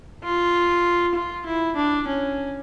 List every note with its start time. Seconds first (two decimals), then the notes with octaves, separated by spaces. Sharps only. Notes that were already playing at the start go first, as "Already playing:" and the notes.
0.23 F4
1.14 F4
1.46 E4
1.76 D4
2.07 C#4